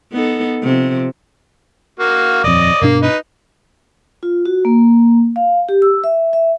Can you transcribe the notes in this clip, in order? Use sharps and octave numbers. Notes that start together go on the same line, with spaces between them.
B3 D#4 A4
C3 F3
A#3 F#4 F5
D#1 F2 D5 D#5
G2 B2 A#3 D4
D#4 B4
F4
F#4
A#3
F5
G4
E6
E5
E5